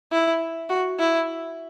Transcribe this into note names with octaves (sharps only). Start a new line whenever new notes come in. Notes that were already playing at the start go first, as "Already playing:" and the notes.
E4
F#4
E4